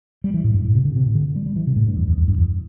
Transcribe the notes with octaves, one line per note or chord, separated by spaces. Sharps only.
G3
E3
A2
G2
A2
C3
D3
C3
A2
D3
G3
G3
E3
C3
A2
G2
E2
E2
E2
G2
E2